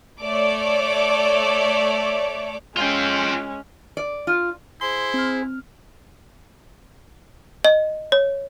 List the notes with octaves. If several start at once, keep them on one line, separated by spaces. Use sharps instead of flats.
A3 C#5 D5 D6
G#3 C#4 F4 G5
D5
F4
E4 G#4 C5 C6
C4 F6
D#5
C#5